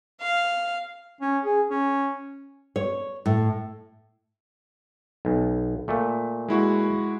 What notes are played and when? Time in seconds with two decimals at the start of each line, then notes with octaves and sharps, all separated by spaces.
0.21 F5
1.21 C#4
1.44 G#4
1.70 C#4
2.76 C#5
3.26 A2
5.25 B1
5.88 A#2 A3
6.48 G#3 E4 F#4